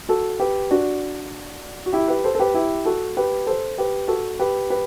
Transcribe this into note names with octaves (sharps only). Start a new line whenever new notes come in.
F#4 A4
G4 B4
D4 F#4
F#4
E4 G4
G4 B4
A4 C5
A4
G4 B4
E4 G4
F#4 A4
G4 B4
A4 C5
G4 B4
F#4 A4
G4 B4
G4 B4